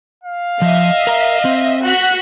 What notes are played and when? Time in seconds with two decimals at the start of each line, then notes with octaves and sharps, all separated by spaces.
0.24 F5
0.62 F3 D#5 E5
1.07 A#4 A#5
1.45 C4
1.84 F#4 F#6 B6